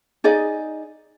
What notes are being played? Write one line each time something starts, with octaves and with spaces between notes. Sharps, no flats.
D#4 G#4 D5 D#5